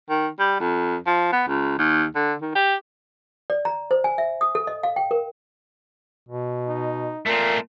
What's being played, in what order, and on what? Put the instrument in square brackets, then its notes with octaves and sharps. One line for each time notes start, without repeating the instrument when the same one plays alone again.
[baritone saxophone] D#3
G3
F2
F3
B3
C#2
D#2
D3
D#3
G4
[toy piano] D5
A#5
C5
G#5
E5
D#6
A4
D#5
F5
G5
A#4
[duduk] B2
[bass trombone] D#4
[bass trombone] A#2 [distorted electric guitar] A3 C4 [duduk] A#4